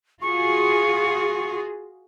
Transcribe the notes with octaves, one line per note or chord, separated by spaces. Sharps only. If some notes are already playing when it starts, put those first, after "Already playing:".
F4 F#4 G#4 C#6